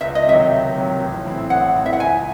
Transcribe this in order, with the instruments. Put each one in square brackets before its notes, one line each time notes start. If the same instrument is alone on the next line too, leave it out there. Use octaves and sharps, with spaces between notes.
[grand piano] C#2 [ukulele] E5
[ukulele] D#5
[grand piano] C3 D#3 F#3 [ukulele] E5
[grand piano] C#2
C3 D#3 F#3
A1
A2 E3 C4 E4
[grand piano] A1 [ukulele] F#5
[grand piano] A2 E3 C4 E4
[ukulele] E5
F#5
[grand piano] C#2 [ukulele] G#5